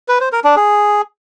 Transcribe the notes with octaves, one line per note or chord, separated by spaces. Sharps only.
B4
C5
A#4
D4
G#4